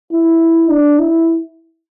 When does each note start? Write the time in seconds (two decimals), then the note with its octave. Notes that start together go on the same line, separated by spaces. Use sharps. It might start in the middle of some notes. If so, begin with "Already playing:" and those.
0.12 E4
0.70 D4
0.99 E4